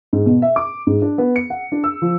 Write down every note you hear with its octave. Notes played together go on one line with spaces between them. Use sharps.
G#2
B2
E5
D6
G#2
D4
B3
C#7
F#5
D4
E6
F3